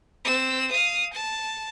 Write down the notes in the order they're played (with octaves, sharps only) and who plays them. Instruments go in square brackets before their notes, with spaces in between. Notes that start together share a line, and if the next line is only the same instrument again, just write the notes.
[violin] C4 E6
F5 D#6
A5